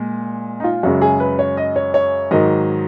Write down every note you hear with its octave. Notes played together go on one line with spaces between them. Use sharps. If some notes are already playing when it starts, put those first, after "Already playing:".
Already playing: A#2 G#3
D#4
F4
F#2 C#3 G#3 F#4
G#4
B4
C#5
D#5
C#5
C#5
G#2 D#3 F#3 D#5